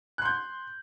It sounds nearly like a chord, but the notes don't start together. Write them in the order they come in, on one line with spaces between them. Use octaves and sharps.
F#6 C6 G6